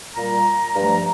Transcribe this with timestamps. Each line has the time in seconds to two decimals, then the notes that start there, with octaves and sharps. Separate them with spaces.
0.16 A#2 G3 A#5
0.75 G2 F3 A3 A#5